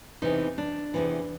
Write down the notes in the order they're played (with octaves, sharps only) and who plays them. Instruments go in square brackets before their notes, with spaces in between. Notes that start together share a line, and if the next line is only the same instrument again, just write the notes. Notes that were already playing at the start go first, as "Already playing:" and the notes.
[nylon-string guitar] E2 C3 E3 D#4
D4
E2 C3 E3